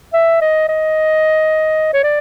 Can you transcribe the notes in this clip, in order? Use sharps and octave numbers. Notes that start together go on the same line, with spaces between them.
E5
D#5
D#5
C#5
D5